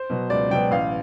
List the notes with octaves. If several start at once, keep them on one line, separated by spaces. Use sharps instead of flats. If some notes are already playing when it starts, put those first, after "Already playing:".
Already playing: C5
B2 F#3
C#2 D5
B2 F#3 G5
A1 F5